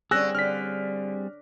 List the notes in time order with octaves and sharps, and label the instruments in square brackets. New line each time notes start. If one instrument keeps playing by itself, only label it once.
[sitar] D3 C#4 [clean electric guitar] G3 C4 G#4 [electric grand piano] E6 F#6 A#6
[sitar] D3 [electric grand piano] F6 B6